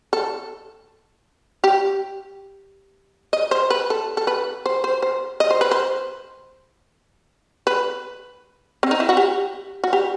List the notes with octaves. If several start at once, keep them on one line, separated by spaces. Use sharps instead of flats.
A4
G4
D#5
C5
B4
A4
A4
B4
C5
C5
C5
D#5
C5
B4
C5
B4
C4
D#4
E4
F#4
G4
F#4
G4